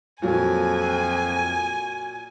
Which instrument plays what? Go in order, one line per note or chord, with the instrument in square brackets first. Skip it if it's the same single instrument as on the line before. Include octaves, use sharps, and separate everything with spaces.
[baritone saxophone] F2 [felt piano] A#2 F#3 [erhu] G#5